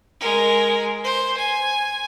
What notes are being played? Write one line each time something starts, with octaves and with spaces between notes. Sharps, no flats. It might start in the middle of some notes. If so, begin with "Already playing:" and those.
G#3 A#4
C5
G#5